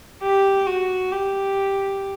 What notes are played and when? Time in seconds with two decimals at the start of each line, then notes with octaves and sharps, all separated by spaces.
0.23 G4
0.66 F#4
1.11 G4